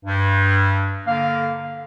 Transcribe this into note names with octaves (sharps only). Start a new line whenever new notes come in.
G2
D3 A#3 F5